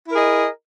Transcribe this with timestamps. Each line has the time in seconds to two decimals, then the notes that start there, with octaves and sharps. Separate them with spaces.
0.07 E4
0.10 A#4
0.14 G#4
0.17 D#5